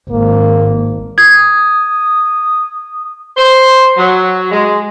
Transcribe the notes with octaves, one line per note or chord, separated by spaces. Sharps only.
G#1 A#3
D#6 G#6
C5
F#3
G#3